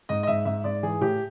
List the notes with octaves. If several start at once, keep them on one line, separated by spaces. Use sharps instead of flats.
G#2 D#5
D#5
G#2 E5
G#2 E5
G#2 D5
E3 G#4
A2 G4